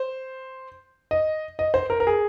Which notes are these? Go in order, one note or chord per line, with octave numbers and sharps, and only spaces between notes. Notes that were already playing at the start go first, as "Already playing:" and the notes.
Already playing: C5
D#5
D#5
C5
A#4
A#4
G#4